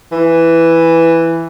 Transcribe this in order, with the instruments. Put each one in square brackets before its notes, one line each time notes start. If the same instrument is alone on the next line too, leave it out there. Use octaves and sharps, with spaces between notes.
[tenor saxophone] E3